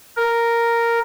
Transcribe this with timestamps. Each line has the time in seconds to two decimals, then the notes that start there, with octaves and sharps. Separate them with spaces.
0.17 A#4